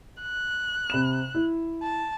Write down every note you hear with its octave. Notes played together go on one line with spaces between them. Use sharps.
F#6
C3 B5 E7
E4
A5